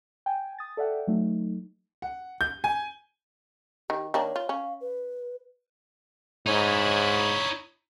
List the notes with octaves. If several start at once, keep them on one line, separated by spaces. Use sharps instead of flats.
G5 G#5
D#6 A6
A4 D5 E5 F#5 G5
F#3 A3 D#4
F#5
G6
G#5
D#3 G4
D#3 A#3 D4 C#5
F4
C#4 F5
B4
G#2 D#4 E4 C#5